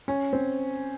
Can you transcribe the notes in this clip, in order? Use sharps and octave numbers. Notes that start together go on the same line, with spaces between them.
C#4
C4